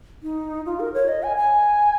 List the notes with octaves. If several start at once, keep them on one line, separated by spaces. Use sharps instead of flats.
D#4
F4
A#4
C#5
D#5
G#5
G#5